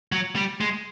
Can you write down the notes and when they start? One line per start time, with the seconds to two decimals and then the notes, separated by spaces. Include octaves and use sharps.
0.12 F#3
0.36 G3
0.61 G#3